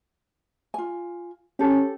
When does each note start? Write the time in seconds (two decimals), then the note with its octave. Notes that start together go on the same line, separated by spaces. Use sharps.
0.74 F4 G#5
1.59 C#4 G4 A4